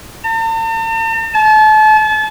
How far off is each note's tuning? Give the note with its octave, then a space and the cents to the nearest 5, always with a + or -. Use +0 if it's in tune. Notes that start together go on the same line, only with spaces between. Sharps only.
A5 +45
A5 -35